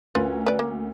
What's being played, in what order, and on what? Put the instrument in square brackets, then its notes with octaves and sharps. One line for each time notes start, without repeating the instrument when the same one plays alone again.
[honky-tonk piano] D2 C#4 A#4 [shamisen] F4 B4
[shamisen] B4 D5
A#3